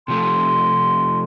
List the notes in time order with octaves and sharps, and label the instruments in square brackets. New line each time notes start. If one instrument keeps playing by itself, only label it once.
[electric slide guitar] C3 F3 A3 [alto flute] C6